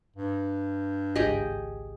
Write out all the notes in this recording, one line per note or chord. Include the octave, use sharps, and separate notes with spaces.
G2
G#1 C#2 G4 G#4 D#5